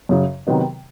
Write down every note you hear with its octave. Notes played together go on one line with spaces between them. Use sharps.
F#2 C#3 F#3
C3 D#3 F#3 B3 D#4